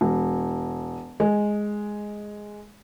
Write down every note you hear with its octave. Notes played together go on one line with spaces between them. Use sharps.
E1
G#3